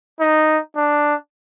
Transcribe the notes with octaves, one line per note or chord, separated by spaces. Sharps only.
D#4
D4